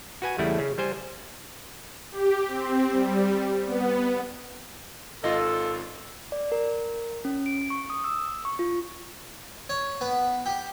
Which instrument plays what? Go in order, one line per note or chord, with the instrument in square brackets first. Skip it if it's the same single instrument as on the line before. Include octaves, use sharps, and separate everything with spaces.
[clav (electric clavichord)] F#4 B4 G#5
E2 C#3 G3 A3 E4
C#3
G3 C5 G#5
[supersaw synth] G4
C4
G3
B3
[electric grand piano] G#1 F4 [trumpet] A4 [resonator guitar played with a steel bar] D#5
[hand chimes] D5
A#4
C#4
D7
C#6
D#6
E6
C#6
F4
[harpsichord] C#5
B3
G4